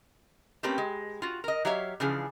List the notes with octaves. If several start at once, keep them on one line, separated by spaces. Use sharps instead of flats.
A3 A#3 C4 C#4 G4 B4
G#3
F4 F#4
A#4 D#5
F#3 G4 C#5 E5 F5
C#3 E3 F3 D4 G#4